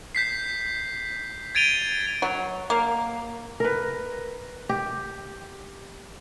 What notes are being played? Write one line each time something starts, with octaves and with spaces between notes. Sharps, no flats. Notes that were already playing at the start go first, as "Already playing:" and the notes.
G6 B6 C7
G#6 A6 D7 D#7 F7 G7
F#3
A#3
A#4 B4
G4